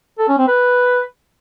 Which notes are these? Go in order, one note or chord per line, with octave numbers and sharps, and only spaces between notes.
A4
C#4
C4
B4